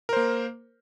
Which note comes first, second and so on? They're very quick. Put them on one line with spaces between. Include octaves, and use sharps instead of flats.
A#4 C5 A#3